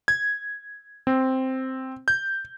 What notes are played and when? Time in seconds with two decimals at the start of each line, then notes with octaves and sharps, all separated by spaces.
0.08 G#6
1.07 C4
2.08 G6